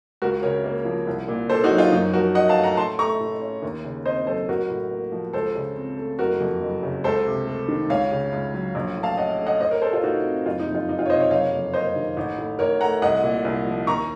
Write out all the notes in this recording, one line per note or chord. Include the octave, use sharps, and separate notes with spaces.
C#2 F#4 A#4
C#3 A#4 C#5
A#3
F3
C2
A#2
A#3 A4 C5
D#4 F#4
F#3
F4
F#2 D#4
F3 F#4 A#4
C#4 D#5 F#5
F5 A5
A3
F#5 A#5
A2 A5 C6
A3 A#5 C#6
A2
C#4
D#2
C#3
C4 C5 D#5
F#3 A4 C5
A1 F#4 A#4
A2
A#3
F3
C#2 A4 C5
C#3
C4
A3
F#1 F#4 A#4
F2
F#1
C#3
C#2 A4 C5
C3
A3
D#3
C#2 C#5 F5
C#3
C#2
F#3
A#1
A2
F5 A5
C#4 D#5 F#5
A3
D#5 F#5
A2 C5 D#5
A#4 C#5
A3 A4 C5
F4 A4
A2 D#4 F#4
C4
F#1 F4
D#4
F2
F4
F#1 D#4
F4
C#5
C3 C5 D#5
C#5 F5
F#1 C#5 F5
F2
A#3 C5 D#5
D#3
A1
A2
A1 A#4 C#5
A3 F#5 A#5
C2 D#5 F#5
A#2
C2
F3
D#2 A#5 C#6